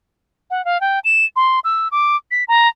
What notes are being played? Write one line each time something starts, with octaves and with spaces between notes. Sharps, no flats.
F#5
F5
G5
E7
C6
E6
D6
B6
A#5